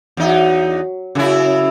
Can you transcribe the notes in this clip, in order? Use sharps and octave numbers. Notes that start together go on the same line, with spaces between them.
E2 F#3 D#4
F#2 C#3 E4 G#4